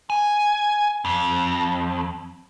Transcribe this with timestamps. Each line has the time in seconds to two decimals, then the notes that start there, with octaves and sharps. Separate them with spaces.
0.10 G#5
1.05 F2